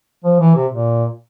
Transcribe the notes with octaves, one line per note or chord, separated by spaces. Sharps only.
F3
E3
C3
A#2